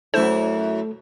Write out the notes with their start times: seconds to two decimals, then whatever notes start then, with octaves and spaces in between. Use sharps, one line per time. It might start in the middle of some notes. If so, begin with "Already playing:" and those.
0.14 F#2 A3 E4 A4 C5